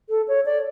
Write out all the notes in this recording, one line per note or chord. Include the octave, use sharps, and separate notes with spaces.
A4
C#5
D5